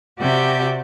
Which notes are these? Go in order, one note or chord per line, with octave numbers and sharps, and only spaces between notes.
C3 F#4 G4 D5 E5 G6